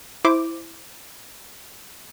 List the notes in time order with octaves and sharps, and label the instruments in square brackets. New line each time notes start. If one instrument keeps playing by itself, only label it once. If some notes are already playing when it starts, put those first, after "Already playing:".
[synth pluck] E4 C5 D6